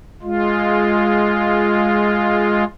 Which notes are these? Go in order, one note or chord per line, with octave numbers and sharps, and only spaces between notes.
G#3 F4